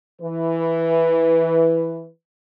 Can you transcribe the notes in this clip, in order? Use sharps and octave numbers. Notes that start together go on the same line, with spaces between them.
E3 B4